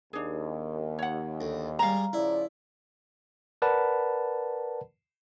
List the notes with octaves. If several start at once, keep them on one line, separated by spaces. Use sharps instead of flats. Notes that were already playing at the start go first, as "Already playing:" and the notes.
D#2 D4 G#4
C#5 F#5
D2
G3 G#3 F5 A#5
C#3 F3 E4 D5
A#4 B4 D5 F#5 A5 B5